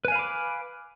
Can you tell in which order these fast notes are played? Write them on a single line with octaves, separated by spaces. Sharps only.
B4 G#5 F5 B5 D6